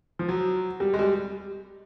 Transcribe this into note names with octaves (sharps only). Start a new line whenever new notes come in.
F3
F#3
G3
G#3
G3